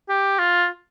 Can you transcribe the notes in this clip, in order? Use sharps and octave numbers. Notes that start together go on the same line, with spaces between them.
G4
F4